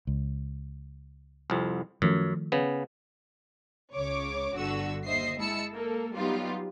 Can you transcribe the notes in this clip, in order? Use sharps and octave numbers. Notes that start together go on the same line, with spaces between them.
C#2
C2 F2
F#2 D#3 F3 A3
C#3 B3
C#2 C#3 C#5 D6
G1 D3 F#4 E6
D#2 C5 D#5 E5 C7
G#3 E4 A5 E6 C#7
A#3 A4
F#3 G3 B3 D#4 F4 G4